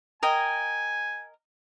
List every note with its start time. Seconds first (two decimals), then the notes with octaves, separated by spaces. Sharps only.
0.23 A#4 D#5 G5 G#5